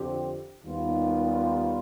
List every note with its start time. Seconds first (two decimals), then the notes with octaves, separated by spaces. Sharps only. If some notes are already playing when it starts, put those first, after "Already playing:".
Already playing: F2 D3 F3 C4 G4
0.64 D#2 D#3 G3 B3 F4